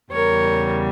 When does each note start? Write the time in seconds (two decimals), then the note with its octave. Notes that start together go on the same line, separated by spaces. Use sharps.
0.12 E2 C#3 G3 A#4 C#5